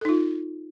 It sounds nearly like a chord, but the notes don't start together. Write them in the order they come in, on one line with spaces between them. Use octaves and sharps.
A4 D#4 F4